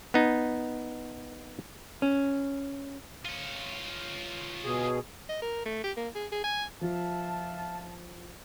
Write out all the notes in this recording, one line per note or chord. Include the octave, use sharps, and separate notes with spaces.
B3 D#4
C#4
F4 C#5
B2 G#4
D#5
A#4
A3
G4
A#3
G#4
G#4
G#5
F3 F4 E5 F5 A5